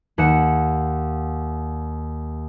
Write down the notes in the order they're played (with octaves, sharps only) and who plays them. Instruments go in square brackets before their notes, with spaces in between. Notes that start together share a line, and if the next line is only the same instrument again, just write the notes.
[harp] D#2 F#5 C#7 E7